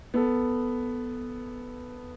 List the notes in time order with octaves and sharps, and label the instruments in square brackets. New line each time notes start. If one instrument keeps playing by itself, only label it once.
[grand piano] B3 A4